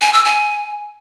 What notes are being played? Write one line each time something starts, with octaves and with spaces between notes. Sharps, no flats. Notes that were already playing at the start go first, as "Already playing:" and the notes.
G#5
E6
G#5